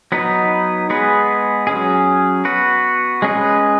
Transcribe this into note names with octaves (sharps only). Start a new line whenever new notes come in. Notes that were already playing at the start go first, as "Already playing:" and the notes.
F#3 B3 D#4 B4
G#3 B3 G#4 B4
F#3 C#4 G#4
B3 F#4 B4
G#3 C#4 G#4 B4